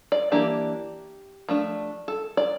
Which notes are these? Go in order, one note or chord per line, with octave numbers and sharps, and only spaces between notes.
D5
E3 A#3 D4 G4
F3 A3 D4
A4
D5